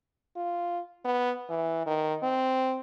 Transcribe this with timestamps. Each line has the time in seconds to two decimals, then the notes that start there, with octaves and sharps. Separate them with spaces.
0.36 F4
1.05 B3
1.49 E3
1.86 D#3
2.23 C4